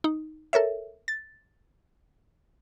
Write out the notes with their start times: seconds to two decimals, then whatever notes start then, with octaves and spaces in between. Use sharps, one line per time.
0.04 D#4
0.53 A4 A#4 C#5 E5
1.08 A6